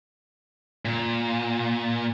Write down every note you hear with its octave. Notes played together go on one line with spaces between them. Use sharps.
A#2